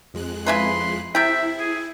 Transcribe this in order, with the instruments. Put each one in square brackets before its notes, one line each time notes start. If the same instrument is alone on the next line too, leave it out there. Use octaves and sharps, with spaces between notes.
[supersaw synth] F2 G#3 F#6
[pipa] C#3 E4 B4 [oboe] C6
[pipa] C3 G5 [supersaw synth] E4 [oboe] E5
[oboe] G#4